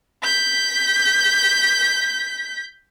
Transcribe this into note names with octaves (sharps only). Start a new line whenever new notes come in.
G6 B6